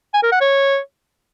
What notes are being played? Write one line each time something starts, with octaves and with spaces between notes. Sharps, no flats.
G#5
A#4
F#5
C#5